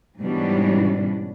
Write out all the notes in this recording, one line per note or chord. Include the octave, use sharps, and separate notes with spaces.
G#2 B2 E3 G3 C#4 D4